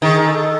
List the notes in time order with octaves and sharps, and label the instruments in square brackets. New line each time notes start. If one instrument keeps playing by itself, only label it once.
[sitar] D#3 [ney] G#4
[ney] A4